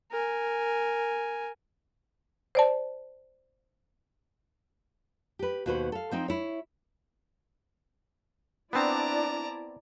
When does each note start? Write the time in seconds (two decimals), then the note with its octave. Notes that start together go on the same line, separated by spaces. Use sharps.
0.11 A#4 G#5
2.55 C5 D5 A5
5.39 G4 B4
5.66 D#2 B2 F#4 B4 C5
5.92 A4 F5
6.11 F3 C4 D#4 G5
6.28 E4 C#5
8.73 B3 C4 D4 E4 D5 A5 A#5